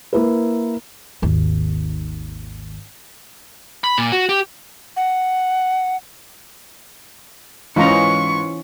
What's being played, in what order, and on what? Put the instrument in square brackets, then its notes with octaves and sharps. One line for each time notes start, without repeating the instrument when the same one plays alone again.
[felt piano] A#3 E4 B4
[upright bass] G#1 D#2
[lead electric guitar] B5
A#2
F#4
G4
[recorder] F#5
[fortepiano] G#2 [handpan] E3 C#4 [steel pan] D#4 F4 A#5 [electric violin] C#6